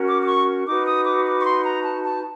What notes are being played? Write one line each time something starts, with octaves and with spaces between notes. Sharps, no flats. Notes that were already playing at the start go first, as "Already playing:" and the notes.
Already playing: C#4 F#4 A#4
D6
D6
C#6
D#4 F#4 B4 D6
D#6
D6
D6
C#6
C6
A#5
A5
A5